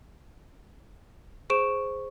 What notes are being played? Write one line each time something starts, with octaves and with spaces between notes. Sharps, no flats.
G#4 C5 C#6 D7 E7